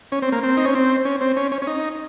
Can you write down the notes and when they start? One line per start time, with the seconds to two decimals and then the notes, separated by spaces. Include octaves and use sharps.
0.12 C#4
0.22 C4
0.32 A#3
0.43 C4
0.57 D#4
0.65 C#4
0.75 C4
1.05 C#4
1.21 C4
1.37 C#4
1.52 C#4
1.62 C#4
1.67 D#4